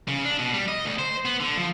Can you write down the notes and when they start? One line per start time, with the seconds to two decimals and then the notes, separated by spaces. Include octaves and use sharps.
0.08 C#3
0.25 D4
0.39 B2
0.53 G3
0.68 D#5
0.85 D2
0.99 C5
1.25 B3
1.40 D3
1.57 F3